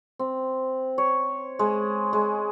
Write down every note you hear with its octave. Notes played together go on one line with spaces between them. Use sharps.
C4
C#5
G#3
G#3